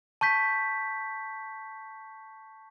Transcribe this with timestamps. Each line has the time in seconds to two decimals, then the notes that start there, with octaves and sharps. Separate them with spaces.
0.21 A5 C#6 G6 B6